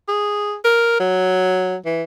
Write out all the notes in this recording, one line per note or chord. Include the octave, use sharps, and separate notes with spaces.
G#4
A#4
F#3
E3